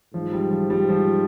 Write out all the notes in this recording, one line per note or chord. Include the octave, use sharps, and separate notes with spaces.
G#2 F3
G3
F3
G3
F3